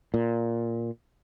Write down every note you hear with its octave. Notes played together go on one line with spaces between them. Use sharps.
A#2